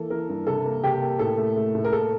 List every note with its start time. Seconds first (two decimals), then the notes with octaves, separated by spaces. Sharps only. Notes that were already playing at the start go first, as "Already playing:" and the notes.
Already playing: E3 A#3 A4
0.10 E3 A#4
0.29 G2
0.47 C3 A4
0.66 A#3
0.84 C3 G4
1.01 A#3
1.19 A2 A4
1.38 A3
1.56 A3
1.75 A2
1.84 A#4
1.92 A#3 A4